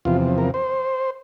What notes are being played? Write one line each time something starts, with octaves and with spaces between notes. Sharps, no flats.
E2 C3 F3 F4
A#4
C5